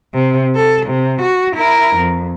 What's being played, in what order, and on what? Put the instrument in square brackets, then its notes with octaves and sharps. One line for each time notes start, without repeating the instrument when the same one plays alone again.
[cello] C3
A4
C3
F#4
E4 A#4
F2